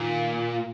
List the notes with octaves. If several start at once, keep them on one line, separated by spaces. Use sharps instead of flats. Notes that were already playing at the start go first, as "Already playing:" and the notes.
Already playing: A#2 D#3